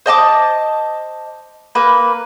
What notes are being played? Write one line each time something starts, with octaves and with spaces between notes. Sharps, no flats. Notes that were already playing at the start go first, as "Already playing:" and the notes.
C5 D#5 A5 D6
A#3 B4